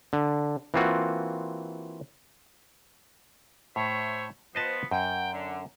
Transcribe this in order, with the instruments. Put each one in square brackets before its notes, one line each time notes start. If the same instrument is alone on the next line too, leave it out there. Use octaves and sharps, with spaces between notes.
[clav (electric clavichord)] D3
E3 A#3 C4 F4 F#4
[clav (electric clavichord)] A2 [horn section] C5 C#5 E5
[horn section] F3 B3 [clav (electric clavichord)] C5 D#5 A5
[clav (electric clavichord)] F#2 [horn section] G5
[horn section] D3